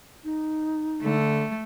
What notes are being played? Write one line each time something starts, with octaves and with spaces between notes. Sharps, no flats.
D#4
D3 A3